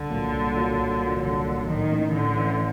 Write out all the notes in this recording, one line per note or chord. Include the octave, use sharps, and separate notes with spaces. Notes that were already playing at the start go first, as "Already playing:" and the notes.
Already playing: C2 D3
A#2 F#3 A#3
C2
A#2 F#3 A#3
C2
A#2 F#3 A#3
C2 D3
A#2 F#3 A#3
A2 D#3
E3 A3 C#4 E4
A2 D3
E3 A3 C#4 E4